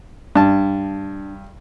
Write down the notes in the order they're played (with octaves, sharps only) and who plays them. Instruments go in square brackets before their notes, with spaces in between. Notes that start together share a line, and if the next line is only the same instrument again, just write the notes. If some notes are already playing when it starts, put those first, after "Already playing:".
[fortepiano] G2 A5 [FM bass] D4